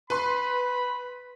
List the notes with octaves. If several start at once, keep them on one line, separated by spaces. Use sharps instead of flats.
B4 B5 C6